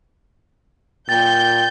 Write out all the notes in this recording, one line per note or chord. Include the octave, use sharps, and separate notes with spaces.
A#2 G5 G6 A6